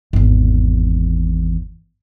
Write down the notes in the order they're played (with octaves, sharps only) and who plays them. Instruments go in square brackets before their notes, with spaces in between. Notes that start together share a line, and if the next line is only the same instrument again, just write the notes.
[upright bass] G#1 E2